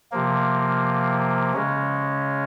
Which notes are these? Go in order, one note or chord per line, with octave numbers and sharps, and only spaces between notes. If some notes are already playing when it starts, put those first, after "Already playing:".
C3 F3 A#3
C#3 G#3 C#4